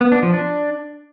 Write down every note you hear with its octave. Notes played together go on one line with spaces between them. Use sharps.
B3
D4
F3
D4